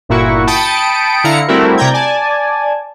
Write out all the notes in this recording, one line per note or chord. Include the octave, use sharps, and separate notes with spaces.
G1 A#2 A#3 E4 F#4 C#6
G5 A5 B5 D#6 C#7 D7
D3 E4 F5 A#5 C#7
G3 A3 C4 E4 F#4 A#4
C3 D5 G5 A#5 G6 G#6
D5 G#5 A5